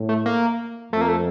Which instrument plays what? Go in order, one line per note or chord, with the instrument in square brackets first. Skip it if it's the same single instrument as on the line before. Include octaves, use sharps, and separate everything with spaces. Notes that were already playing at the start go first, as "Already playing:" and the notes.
Already playing: [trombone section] A2
[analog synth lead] A3
A#3
[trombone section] F2 [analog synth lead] A3
[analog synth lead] A#3
A3